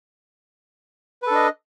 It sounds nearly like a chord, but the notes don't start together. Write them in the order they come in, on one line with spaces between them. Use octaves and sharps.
B4 A4 D4 D#5